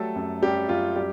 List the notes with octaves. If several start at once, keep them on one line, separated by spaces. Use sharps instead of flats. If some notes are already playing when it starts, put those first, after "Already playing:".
Already playing: F#3 G3 A3 A4
F#2
F#2 G3 G4
F#2 F4
G3 G4